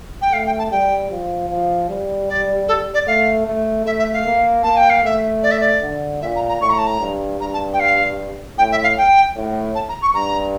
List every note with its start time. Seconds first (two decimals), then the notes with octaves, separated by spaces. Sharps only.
0.21 G5
0.32 A3 F5
0.46 G5
0.58 A5
0.71 G3 G5
1.11 F3
1.50 F3
1.90 G3
2.29 D5
2.68 A4
2.94 D5
3.07 A3 F5
3.47 A3
3.86 A3 E5
3.99 E5
4.13 F5
4.26 A#3
4.63 A#3 A5
4.77 G5
4.90 F5
5.04 A3 E5
5.43 D5
5.51 E5
5.60 D5
5.82 D3
6.21 A#2 E5
6.36 A#5
6.48 A#5
6.61 A2 C#6
6.69 A#5
6.78 A5
6.87 A#5
7.01 G2
7.40 G2 A#5
7.53 A5
7.73 G5
7.80 F5
8.58 A2 G5
8.71 E5
8.83 F5
8.97 G5
9.36 A2
9.75 A5
9.89 A#5
10.02 C#6
10.14 G2 A#5